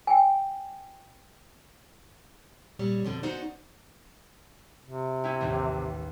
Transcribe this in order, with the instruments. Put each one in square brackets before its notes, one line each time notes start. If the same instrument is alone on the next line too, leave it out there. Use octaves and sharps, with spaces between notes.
[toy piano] G5 G#5
[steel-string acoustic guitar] A#2 G3 C#5
F2 B2 D3
B3 C#4 D#4 F#4 C5 D5
[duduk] C3
[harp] C#4 E4 G4
A1 D#2 A2